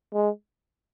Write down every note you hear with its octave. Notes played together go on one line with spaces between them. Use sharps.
G#3